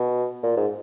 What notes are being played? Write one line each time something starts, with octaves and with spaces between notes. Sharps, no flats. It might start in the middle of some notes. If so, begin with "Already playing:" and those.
Already playing: B2
A#2
G#2